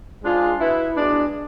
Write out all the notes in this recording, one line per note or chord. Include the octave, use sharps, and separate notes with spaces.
G#2 G#3 D4 F4 G#4
B2 B3 E4
B2 G#3 D4